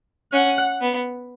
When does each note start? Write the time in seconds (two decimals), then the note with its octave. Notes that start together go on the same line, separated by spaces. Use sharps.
0.33 C#4 F#5
0.81 B3